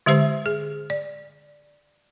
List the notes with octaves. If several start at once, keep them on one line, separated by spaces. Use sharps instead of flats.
D3 G#3 G4 C5 E5
G#4
D5